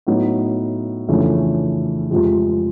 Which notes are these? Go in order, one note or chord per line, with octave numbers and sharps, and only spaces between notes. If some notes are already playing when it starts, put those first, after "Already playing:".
A2 F#3 B3 D#4
F2 C#3 E3 A3 D4
F2 C3 F3 G#3